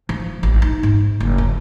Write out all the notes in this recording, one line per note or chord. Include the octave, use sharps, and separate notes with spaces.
F3
A1
D#4
G#2
F#1
F2